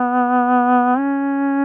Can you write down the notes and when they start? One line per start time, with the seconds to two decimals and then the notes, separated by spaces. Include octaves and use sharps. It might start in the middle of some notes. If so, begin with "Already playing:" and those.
Already playing: B3
0.98 C#4